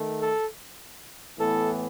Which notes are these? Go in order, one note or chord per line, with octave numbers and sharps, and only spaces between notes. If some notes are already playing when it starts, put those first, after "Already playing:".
Already playing: D#3 A3
A4
A2 E3 B3 A4